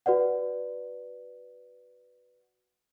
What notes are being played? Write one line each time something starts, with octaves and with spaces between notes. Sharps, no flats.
F#4 B4 D5 F#5